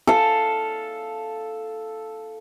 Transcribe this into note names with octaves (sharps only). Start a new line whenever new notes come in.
A4 F5